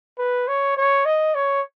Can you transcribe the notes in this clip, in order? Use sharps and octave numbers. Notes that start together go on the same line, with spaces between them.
B4
C#5
C#5
D#5
C#5